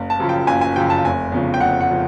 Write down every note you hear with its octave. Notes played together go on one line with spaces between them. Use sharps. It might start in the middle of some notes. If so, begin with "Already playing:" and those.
Already playing: F#1
A5
F#2 C#3 F3
G5
F#1 G#5
G#5
F#2 C#3 F3 G5
A5
F1 G#5
E2 C#3 F3
G5
F1 F#5
F#5
C#3 F3